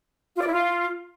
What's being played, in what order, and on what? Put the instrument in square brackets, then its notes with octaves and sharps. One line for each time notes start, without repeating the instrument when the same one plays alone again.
[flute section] F4
D5
E4
F4